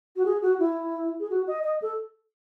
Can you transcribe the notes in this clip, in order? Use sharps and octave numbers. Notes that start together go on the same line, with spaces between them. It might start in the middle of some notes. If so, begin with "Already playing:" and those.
F#4
G#4
F#4
E4
G#4
F#4
D#5
D#5
A4